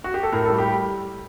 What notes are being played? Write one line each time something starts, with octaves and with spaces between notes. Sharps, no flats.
F#4
G4
A4
A2 A#4
G3 A4
G4